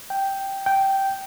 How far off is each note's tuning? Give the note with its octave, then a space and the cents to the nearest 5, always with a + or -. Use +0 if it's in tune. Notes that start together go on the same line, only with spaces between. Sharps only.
G5 -5
G5 -10